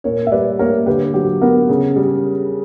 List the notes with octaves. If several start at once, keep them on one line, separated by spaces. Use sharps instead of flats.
A#2 A#4 C#5
E5
G3 B4 D5
A#3 A#4 C#5
D3 G4 B4
F#3 G4
B3 A#4
C#3
G3